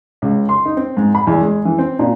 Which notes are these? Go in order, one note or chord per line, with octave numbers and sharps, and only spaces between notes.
C#2
C6
D#4
C4
G#2
B5
E2
G#3
E3
C4
A#2